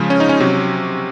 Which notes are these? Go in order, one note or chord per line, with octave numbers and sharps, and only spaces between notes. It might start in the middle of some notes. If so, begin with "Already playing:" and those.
Already playing: C#3 F3 G#3
C#4
D#4
C#4
C3 F#3 C#4